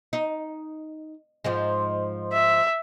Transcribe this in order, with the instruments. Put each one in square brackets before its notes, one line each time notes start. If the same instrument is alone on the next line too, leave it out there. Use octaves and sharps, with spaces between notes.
[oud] D#4
G#2 F3 G#3
[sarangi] E5